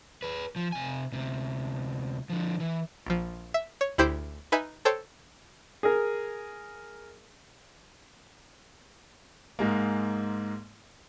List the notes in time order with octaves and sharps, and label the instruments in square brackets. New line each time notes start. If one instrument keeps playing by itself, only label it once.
[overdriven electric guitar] G#4 B4
F3
C3 G#5
D2 C3
D3 F3
E3
[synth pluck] A#1 F3
E5
C#5
D2 E4 G4 C5 G6
D#4 B4 E5 G#5
A4 C5 C#5 G5 E6
[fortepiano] G#4 A#4
[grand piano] G#2 G#3 A#3